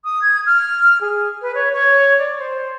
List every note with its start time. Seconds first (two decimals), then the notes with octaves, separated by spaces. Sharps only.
0.04 D#6
0.21 G#6
0.46 F6
1.01 G#4
1.42 B4
1.55 C#5
1.73 C#5
2.18 D5
2.39 C5